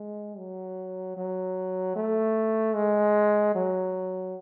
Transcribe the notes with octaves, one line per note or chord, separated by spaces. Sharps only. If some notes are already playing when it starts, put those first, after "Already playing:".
Already playing: G#3
F#3
F#3
A3
G#3
F#3